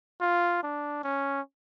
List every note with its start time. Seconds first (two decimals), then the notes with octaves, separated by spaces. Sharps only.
0.21 F4
0.63 D4
1.04 C#4